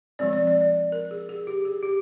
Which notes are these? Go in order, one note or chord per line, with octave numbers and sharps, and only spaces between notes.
F3 G#3 C4 D5
D5
D5
D5
A#4
G#4
G#4
G4
G#4
G4